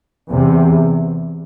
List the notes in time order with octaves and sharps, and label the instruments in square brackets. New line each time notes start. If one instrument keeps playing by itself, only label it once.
[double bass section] E2 C3